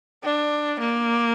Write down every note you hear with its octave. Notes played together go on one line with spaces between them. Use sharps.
D4
A#3